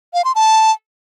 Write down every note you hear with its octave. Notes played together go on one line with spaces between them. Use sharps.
F5
C6
A5